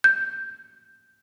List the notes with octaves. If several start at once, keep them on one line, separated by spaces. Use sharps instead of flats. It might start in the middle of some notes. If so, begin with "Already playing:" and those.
G6